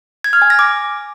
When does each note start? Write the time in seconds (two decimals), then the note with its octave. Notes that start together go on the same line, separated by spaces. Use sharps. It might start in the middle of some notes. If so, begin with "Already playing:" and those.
0.24 G#6
0.33 F6
0.42 G#5
0.50 A#6
0.59 D6